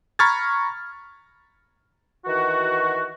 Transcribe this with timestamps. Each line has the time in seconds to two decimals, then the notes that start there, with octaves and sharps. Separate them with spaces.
0.19 A#5 B5 C#6 F6 G#6 A6
2.25 D#3 E3 F#4